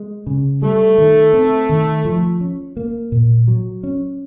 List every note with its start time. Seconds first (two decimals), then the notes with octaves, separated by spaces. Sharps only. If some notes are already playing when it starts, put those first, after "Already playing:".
Already playing: G#3
0.27 C#3
0.62 G3 A3
0.98 D#3
1.33 C4
1.69 D#3
2.05 F3
2.41 C#4
2.77 A#3
3.12 A#2
3.48 F#3
3.83 C#4